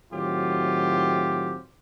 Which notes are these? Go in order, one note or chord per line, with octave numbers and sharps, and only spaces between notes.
A2 D#3 F#3 C4 F4 G4